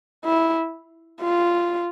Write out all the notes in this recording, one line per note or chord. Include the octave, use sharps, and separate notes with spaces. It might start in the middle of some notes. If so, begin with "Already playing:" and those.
E4
F4